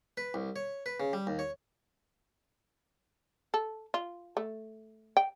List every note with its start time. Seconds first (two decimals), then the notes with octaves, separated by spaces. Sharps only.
0.17 B4
0.34 C2
0.56 C#5
0.86 B4
1.00 C#3
1.13 G3
1.27 D#2
1.39 C#5
3.54 A4
3.94 F4
4.37 A3
5.17 G5